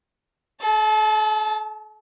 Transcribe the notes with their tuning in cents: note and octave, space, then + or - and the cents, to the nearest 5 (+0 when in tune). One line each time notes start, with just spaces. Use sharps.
A4 -40 A5 +0